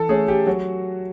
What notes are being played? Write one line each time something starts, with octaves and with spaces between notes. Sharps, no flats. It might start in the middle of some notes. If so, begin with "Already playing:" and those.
Already playing: E3 A4
A3 C#4 G#4
G4
F#3 F#4